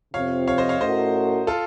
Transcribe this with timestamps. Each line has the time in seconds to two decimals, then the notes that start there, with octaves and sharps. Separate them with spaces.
0.13 F2 C3 F3 C4 F4 C#5 F5
0.47 C#5 F5
0.58 C5 D#5
0.69 C#5 F5
0.81 A2 A3 C#4 F#4 A#4 C5 D#5
1.47 F4 A4